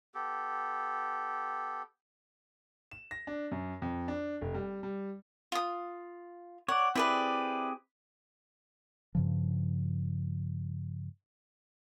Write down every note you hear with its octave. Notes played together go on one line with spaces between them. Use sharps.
B3 G4 A4
E7
A#6
D4
F#2
F2
D4
F1
G3
G3
F4 D#6
C#5 D5 F#5
C4 E4 G4 G#4 B4 D5
G2 C#3 F3